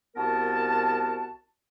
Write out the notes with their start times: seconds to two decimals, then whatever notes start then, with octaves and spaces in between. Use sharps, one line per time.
0.16 C2 B3 F#4 A#4 A5